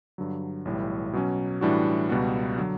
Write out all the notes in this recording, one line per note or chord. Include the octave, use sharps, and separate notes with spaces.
G2 D3 F#3
B1 A2 E3 G3
B2 F#3 C#4
A2 E3 G3 D4 F#4
C#2 B2 G3 B3 F#4
D3 F#3